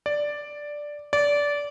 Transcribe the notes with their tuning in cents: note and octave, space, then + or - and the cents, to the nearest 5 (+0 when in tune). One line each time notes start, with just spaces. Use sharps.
D5 +0
D5 -20